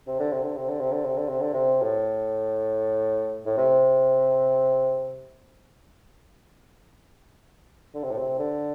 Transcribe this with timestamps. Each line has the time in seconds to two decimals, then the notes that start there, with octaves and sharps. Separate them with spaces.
0.08 C3
0.20 D3
0.32 C3
0.44 D3
0.56 C3
0.69 D3
0.80 C3
0.92 D3
1.05 C3
1.17 D3
1.29 C3
1.41 D3
1.53 C3
1.83 A2
3.46 A2
3.58 C3
7.95 D3
8.03 C3
8.11 A2
8.18 C3
8.39 D3